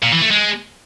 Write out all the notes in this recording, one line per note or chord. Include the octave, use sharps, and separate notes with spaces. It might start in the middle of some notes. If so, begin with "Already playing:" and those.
A#2
E3
A3
G#3